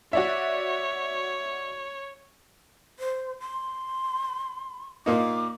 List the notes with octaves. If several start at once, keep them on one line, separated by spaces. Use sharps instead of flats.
F#4 C#5 D5 E5
C5
C6
A#2 A#3 D#4 D6